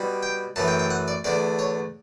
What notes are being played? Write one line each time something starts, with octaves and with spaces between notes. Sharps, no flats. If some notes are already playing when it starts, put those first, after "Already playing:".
Already playing: B2 G3
G5
F#2 E3 A3 A5
G5
G5
F#5
D5
E2 D3 A3 D5
C#5